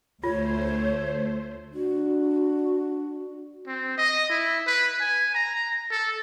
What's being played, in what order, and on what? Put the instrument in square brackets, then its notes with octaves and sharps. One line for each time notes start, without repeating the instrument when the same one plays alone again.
[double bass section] D2 [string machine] A3 C5 [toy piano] F4 [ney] C#5
[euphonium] D4 [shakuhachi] F#4
[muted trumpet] C4
D#5
E4
B4
G#5
A#5
A4